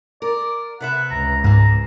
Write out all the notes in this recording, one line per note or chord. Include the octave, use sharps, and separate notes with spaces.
A#4 D5
C3 B4 E5 F#5
C#2 A#5
G#2 G#3 C4 A#5